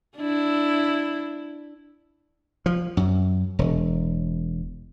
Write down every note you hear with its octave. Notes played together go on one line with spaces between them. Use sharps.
D4 E4
F3
F#2
E1